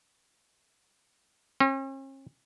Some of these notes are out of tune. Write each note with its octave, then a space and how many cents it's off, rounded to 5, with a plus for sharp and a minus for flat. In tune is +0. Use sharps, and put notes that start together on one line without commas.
C#4 -45